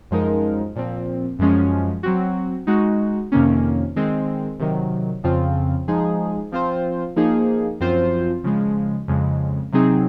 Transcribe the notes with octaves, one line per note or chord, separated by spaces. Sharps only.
F#2 F3 G#3 D#4 A#4
A#2 F3 C4
F#2 F3 G#3 C#4
F#3 C4 F#4
G#3 D#4 F#4
F2 C3 D#3 A#3 C#4
D#3 G#3 C4
C3 D#3 F#3
F2 C#3 F3 C4 F4
F3 G#3 D#4 G#4
F3 C4 F4 C5
F3 A#3 D#4 G#4
F#2 F3 C4 F4 C5
C#3 F3 G#3
F2 C#3 G#3
C3 F#3 C4 D#4 G#4